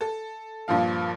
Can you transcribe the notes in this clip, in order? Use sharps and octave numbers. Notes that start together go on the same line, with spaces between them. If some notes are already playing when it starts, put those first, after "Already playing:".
A4
G2 A#2 F3 F5